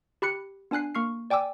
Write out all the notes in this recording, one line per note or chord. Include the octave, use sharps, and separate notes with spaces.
G4 B5 F#6 C#7
B3 D4 G#5 F#6 C7
A#3 C#6 F6 C7
D5 G5 G#5 D6 E6